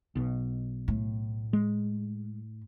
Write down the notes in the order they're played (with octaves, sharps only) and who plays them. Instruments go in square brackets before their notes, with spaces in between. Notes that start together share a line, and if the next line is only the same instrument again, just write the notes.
[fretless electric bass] B1 B2
[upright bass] A2
[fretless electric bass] G#3